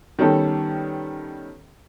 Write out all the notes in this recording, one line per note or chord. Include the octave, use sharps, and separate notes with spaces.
D#3 G3 B3 C#4 G4 A4